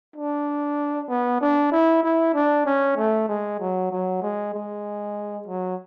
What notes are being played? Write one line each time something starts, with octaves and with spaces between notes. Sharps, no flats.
D4
B3
D4
E4
E4
D4
C#4
A3
G#3
F#3
F#3
G#3
G#3
F#3